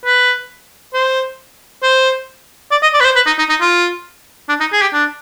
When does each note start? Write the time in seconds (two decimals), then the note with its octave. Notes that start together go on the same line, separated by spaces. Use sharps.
0.06 B4
0.94 C5
1.83 C5
2.71 D5
2.83 D#5
2.94 D5
3.00 B4
3.05 C5
3.16 B4
3.27 D#4
3.38 D#4
3.49 D#4
3.61 F4
4.49 D4
4.60 D#4
4.73 G#4
4.82 G4
4.93 D4